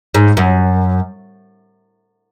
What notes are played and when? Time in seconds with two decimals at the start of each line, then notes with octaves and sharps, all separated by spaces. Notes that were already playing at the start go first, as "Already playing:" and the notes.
0.15 G#2
0.37 F#2